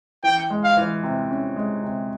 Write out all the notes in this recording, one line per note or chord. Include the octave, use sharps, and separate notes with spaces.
E3 G5
G#3
F5
E3
C3
C#4
G#3
C3